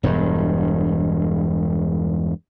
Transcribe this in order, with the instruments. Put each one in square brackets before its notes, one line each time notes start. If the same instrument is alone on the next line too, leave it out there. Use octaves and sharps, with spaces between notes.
[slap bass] E1 G2